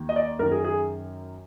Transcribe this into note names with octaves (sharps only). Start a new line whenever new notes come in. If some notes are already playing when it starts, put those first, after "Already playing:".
Already playing: D#2 D#3
D#5
D5
F#2 D#3 A#4
G#4
G#4